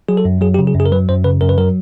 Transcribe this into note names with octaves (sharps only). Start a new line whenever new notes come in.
F#3 G#4
A4
F#2
F#3 G#4
G4
C#3
G#4
F#2
G#4
A#4
F#3 B4
F#2 C5
C#3 B4
F#2 A#4
B4
F#3 A#4